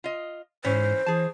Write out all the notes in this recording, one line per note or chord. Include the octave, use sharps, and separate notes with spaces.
F4 D#5
G#2 E3 C#4 C5
E3 G#4 A5